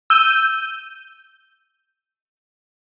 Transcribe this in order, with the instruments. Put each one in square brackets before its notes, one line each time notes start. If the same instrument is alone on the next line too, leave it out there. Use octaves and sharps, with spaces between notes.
[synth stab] E6 G6 D#7